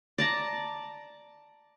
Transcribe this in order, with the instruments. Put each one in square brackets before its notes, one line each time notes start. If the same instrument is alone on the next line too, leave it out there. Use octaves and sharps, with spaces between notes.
[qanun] D5 A5 A#5